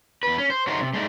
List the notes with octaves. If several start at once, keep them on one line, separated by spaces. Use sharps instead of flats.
E2 B4
C#4
C5
F#3 A3 D#4 A#4 C5
C3
G#3 A3 D4 D#4